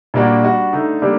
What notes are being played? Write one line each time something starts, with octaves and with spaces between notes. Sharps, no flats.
A#2 G3 A#3 D4 F#4
G3 D4 F#4
D3 A3 D#4
D3 G3 A#3 D4 G4